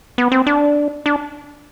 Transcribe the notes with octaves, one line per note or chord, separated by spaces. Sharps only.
B3
C4
D4
D4